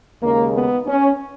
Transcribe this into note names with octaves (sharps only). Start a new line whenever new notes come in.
D#2 C#3 G#3 A#3
B3
C#4